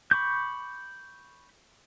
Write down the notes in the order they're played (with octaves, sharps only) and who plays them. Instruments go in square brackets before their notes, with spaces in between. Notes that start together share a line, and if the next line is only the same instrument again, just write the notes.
[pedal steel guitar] B5 C#6 D6 G6